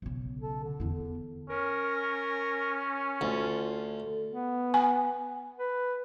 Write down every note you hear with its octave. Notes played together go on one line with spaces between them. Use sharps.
B1 C#3
A4
D3
E2 E4
C#4 A#4
D2 F4
B3
G#5
B4